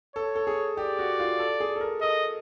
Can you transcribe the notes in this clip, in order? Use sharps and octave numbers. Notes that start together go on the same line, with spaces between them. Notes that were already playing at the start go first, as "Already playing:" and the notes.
A4 C#5
A4
G#4
G4 D5
F#4
F4
A4
G#4
A4
A#4
A4 D#5